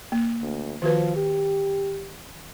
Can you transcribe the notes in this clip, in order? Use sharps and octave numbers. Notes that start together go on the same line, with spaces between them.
A#3
D2
D#3 F3 F#4 B4
G4